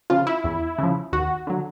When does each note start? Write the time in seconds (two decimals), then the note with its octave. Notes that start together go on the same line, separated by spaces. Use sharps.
0.10 C#3 F3 F4
0.27 E4
0.44 E2
0.78 C#3 F3
1.13 D#2 F#4
1.47 D3 F#3